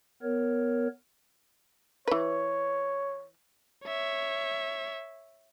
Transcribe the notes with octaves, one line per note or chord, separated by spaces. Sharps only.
B3 A#4 C#5
E3 B4 C#5
C#5 E5